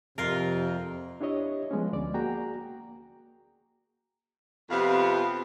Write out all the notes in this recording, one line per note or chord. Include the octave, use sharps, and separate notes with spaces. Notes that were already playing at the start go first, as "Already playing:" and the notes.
F2 C3 F4 A#4
D4 E4 G4 C#5 D#5
F3 G#3 B3 C#4
D2 D5
A#3 F#4 G#4 G5 A#5
F2 C3 F3 B3 F5